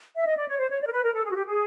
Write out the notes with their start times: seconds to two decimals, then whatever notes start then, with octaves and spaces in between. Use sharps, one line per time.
0.17 E5
0.26 D#5
0.37 D5
0.48 C#5
0.59 C5
0.70 C#5
0.81 D5
0.86 A#4
0.92 B4
1.03 A#4
1.14 A4
1.25 G#4
1.31 F#4
1.35 G4
1.46 G#4